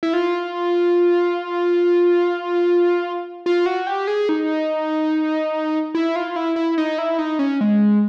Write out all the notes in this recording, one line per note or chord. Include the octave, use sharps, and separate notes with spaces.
E4
F4
F4
F#4
G4
G#4
D#4
E4
F4
E4
E4
D#4
E4
D#4
C#4
G#3